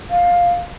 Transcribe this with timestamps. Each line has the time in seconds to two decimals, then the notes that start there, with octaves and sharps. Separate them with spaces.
0.11 F5